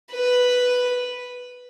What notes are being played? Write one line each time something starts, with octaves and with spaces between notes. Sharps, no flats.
B4